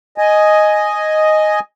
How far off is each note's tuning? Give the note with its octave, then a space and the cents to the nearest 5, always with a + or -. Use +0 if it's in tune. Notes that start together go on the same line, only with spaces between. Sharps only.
D#5 +0 G#5 +5